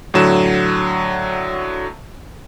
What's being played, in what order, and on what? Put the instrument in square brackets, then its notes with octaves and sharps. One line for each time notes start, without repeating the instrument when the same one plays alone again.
[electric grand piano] A2 D3 F#3 E7